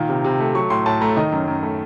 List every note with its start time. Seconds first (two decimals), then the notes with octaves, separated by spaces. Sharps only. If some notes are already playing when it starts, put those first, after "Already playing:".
Already playing: A#2 D#3
0.09 C3
0.24 C3
0.40 A3
0.55 F#3 C#6
0.70 A2 C6
0.86 A2 A5
1.01 A3 A#5
1.17 D#3 D#5
1.32 F#2
1.48 F#2
1.63 A3